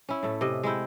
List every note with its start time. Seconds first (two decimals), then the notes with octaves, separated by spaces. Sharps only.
0.09 C#4 E4
0.23 A2 A3
0.41 C3 D#5
0.63 G#3 A3 E4 G5